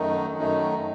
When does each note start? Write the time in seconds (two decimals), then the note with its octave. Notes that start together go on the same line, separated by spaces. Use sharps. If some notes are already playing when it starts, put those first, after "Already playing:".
Already playing: F#2 D#3 F#3 A3 D#4
0.36 F#2 D#3 F#3 A3 D#4